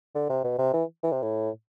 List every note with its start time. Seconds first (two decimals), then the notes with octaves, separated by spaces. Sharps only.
0.15 D3
0.29 C3
0.44 B2
0.58 C3
0.73 E3
1.03 E3
1.12 C3
1.22 A2